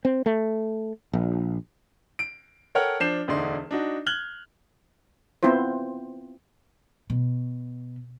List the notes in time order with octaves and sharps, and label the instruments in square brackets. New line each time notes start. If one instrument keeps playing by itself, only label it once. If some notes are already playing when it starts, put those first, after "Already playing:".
[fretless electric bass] C4
A3
A#1
[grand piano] D7
A4 A#4 C#5 F#5 G5 F6
F3 D4 G6 C7 E7
E1 D2 D3 D#4 D5 C6
D4 D#4 F#4
F6 F#6 G#6 F#7 G7
[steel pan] B3 C4 E4 F4 C5
[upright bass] B2